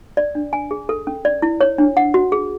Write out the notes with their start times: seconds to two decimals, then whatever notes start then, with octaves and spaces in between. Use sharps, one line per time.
0.17 D5
0.35 D4
0.53 G#5
0.71 G#4
0.89 A4
1.07 C#4
1.25 D5
1.42 E4
1.61 C#5
1.78 D4
1.97 F#5
2.14 F#4
2.32 G#4